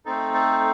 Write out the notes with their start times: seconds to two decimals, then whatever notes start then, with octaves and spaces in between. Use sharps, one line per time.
0.06 A3 C4 D#4 A4
0.34 A4